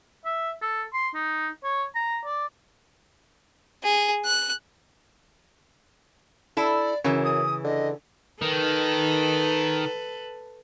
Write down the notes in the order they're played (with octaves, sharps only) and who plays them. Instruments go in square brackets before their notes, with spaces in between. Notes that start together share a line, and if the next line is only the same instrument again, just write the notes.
[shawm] E5
A4
C6
D#4
C#5
A#5
D5
[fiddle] G#4
F#6
[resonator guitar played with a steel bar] E4 A4 [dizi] D5
[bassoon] F#2 [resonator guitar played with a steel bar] C#3 E3
[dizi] D#6
[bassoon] D3 [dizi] D#5
[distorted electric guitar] D#3 [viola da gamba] A4 B4